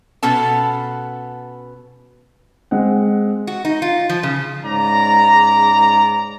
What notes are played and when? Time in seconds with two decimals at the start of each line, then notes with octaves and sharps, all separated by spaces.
0.23 B2 B3 C#4 A4 A5
2.71 G#3 C4 F#5
3.47 F#4
3.65 D#4
3.82 F4
4.09 F3
4.23 C#3
4.64 G#2 C#3 D5 A#5